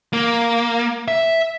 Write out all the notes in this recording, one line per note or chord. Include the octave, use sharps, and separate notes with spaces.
A#3
E5